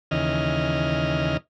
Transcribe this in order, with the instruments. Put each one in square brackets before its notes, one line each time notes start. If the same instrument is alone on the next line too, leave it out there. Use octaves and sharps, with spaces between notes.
[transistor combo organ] D#2 C#3 E3 D#5 F6